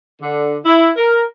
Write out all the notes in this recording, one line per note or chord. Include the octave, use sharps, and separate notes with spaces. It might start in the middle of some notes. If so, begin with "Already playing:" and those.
D3
E4
A#4